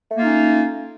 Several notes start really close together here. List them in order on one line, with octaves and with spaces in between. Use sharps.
A3 A#3 F4 D#4 C#4